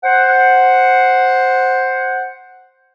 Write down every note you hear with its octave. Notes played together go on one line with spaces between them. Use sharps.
C5 F#5